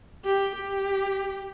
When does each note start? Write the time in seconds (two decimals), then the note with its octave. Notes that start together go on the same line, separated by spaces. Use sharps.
0.25 G4
0.56 G4